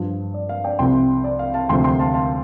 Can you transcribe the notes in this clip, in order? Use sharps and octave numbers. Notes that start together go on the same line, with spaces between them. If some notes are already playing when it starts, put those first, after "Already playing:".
Already playing: G2 F3
D5
F5
D5 G5
C2 C3 F3 G5 C6
D5
F5
F5 A5
D2 C3 F3 G5 C6
G5 C6
F5 A5
F5 A5